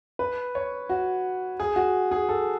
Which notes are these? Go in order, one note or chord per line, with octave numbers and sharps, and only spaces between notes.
B4
C#5
F#4
G#4
F#4
G#4
A4